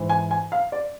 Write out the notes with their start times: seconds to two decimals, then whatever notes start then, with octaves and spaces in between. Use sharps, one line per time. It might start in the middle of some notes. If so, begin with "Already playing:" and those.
Already playing: G#2 E3
0.09 G#5
0.31 G#5
0.52 F5
0.72 D5